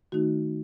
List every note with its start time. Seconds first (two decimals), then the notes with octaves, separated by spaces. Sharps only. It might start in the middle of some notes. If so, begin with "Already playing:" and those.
0.12 D#3 A3 D#4 F#4